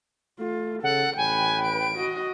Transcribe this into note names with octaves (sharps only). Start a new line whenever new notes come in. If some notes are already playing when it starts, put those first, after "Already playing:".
A3 F4
C#3 A4 F#5
A1 B4 G5 G#5
D7
F#4 D#5